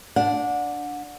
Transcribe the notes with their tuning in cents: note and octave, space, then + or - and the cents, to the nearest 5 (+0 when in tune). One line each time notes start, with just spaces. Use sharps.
D4 -5 F#5 -30